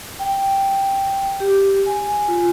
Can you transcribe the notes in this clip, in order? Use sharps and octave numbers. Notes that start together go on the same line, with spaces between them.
G5
G4
G#5
F4